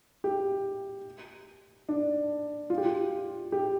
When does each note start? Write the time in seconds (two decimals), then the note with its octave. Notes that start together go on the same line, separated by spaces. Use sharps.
0.24 G4
1.89 D4
2.70 F4
2.78 G4
2.85 F4
3.52 G4